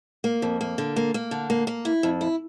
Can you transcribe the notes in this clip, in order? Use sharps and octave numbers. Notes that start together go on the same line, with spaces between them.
A#3
F2
A#3
D3
A#3
A#3
D3
A#3
A#3
E4
F2
E4